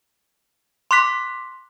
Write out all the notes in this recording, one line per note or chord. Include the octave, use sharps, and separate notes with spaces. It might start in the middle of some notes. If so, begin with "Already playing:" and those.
C6 D6 F#6 B6